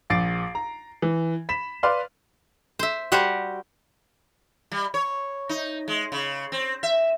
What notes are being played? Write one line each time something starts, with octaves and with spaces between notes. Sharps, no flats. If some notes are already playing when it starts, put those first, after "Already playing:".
A#1 D6 A6 C7 D7
A#5
E3
B5 B6 E7
B4 D5 F5 C6 F6
C5 E5
G3 F#4 G4 C5 F#5
G3
C#5
D#4
G#3
C#3
C4
E5